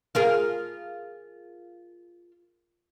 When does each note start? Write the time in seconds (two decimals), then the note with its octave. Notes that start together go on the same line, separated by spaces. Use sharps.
0.15 F4 G#4 A#4